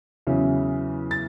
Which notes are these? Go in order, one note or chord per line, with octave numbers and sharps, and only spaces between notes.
E2 C#3 F#3 C#4 E4
A6